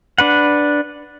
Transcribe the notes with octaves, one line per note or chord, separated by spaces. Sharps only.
D4 B4 F#5